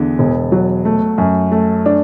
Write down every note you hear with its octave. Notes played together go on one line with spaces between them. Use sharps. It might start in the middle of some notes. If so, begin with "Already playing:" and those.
Already playing: E2 D3
E1
F#3
A3
F#2
A3
D4